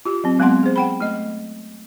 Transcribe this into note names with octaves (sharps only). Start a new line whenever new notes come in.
F4 G4
F#3 C4
F#3 G#3 B3 C4 F#5 C6
G#4 C5
F#5 G5 B5
A3 D#5